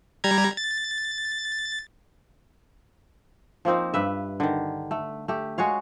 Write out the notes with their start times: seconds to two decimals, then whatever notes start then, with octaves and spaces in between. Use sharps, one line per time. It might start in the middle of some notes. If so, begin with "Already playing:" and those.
0.24 G3 A#5 G#6
0.57 A6
3.65 F3 A#3 C4 D#4
3.94 G2 B4 E5
4.40 D3 D#3
4.91 A3
5.28 A3 G4
5.58 G#3 F#4 C#5 F5